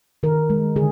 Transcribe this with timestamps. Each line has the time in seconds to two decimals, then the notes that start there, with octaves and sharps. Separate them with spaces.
0.23 D#3 A#4
0.50 G#3
0.76 D3 G#4